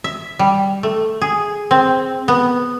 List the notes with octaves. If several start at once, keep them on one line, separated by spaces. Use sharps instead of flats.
E5
G3
A3
G#4
C4
B3